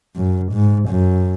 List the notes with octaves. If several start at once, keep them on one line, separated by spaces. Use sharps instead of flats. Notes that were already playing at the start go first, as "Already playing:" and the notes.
F#2
G#2
F#2